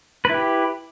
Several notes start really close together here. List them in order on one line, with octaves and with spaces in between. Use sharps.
B4 E4 G4